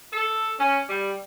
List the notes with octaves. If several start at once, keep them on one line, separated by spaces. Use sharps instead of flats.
A4
C#4
G3